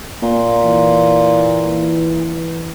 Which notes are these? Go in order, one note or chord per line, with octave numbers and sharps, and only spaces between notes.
A#2
E3